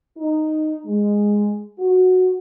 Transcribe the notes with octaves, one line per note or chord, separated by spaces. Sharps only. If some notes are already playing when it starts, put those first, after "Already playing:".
D#4
G#3
F#4